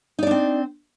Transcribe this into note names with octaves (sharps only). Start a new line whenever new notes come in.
C4 D4 D#4 D5